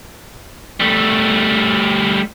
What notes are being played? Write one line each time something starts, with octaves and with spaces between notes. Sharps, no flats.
G3 A3